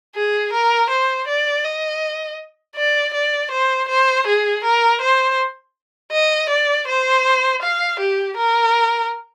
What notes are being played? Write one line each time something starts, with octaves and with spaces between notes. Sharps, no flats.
G#4
A#4
C5
D5
D#5
D5
D5
C5
C5
G#4
A#4
C5
D#5
D5
C5
F5
G4
A#4